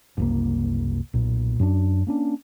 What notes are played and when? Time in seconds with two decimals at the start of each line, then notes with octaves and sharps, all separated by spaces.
0.17 F#1 C2 A#3
1.14 B1 A#2
1.60 F#2 D4
2.07 A#3 C#4 D4